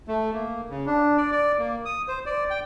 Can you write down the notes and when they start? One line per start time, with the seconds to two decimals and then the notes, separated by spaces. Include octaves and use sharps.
0.08 A3
0.33 A#3
0.70 C#3
0.87 D4
1.17 D5
1.32 D5
1.59 A#3
1.85 D#6
2.08 C5
2.26 D5
2.50 G5